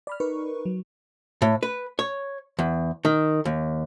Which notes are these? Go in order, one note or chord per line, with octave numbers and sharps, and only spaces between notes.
D5 B5 F6
D#4 A#4 B4 C#6
F#3
A2
B4
C#5
E2
D#3
D#2